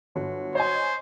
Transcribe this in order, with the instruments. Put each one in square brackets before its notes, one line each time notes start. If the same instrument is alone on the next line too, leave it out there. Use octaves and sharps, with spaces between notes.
[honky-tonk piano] G1 [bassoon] F#3
[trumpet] C5 [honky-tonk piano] C#5 D#5 G#5